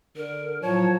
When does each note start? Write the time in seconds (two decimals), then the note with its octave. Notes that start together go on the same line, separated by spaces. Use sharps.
0.16 D3 A#4
0.62 A2 F3 F#3 C#5 A5